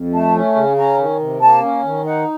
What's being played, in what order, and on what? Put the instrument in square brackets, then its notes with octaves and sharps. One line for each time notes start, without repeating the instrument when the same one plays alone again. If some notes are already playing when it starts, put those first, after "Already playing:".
Already playing: [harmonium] F2
[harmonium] A3 [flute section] A5
[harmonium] C#4
C#3
[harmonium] C#4 [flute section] A#5
[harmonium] D#3
C3
[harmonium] A#3 [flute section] A5
[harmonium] C#4
D#3
[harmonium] D#4 [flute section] F#5